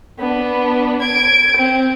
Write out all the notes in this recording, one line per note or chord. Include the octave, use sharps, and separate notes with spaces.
B3 D4
G#6 D7
C4